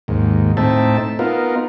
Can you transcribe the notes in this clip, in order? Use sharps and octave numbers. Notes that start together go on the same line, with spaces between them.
D#2 G#2
A2 C4 D#4 E5 A5
B3 D#4 F4 A#4